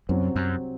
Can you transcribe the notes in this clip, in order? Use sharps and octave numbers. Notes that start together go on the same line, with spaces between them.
C2 F#2 C3 F#3 C4
F#2